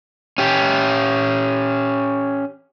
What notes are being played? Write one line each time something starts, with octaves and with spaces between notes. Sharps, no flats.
C#4 G4